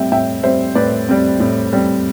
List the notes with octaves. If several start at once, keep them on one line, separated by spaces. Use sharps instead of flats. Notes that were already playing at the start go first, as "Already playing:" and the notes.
Already playing: A2 G3 C4 E5 G5
A2 E5 G5
G3 C4 C5 E5
A2 B4 D5
G3 C4
A2
G3 C4